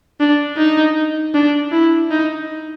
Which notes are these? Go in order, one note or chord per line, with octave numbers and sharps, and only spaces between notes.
D4
D#4
D4
E4
D#4